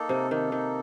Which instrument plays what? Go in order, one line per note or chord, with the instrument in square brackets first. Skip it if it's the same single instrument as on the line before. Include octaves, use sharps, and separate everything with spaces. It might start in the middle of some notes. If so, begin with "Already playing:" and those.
Already playing: [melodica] A#3 D#4 A4
[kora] C3
[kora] D#3 [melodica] A#3 D#4 A4
[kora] D#3